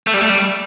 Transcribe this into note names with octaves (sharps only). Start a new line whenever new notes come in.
A3
G3
A3
G3